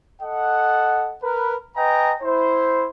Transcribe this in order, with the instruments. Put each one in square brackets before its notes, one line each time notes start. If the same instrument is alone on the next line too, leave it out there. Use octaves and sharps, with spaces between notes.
[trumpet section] A4 D#5 F#5
A#4 B4
B4 D#5 G5 G#5 A#5
E4 C5